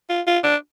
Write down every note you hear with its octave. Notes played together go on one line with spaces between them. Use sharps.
F4
F4
D4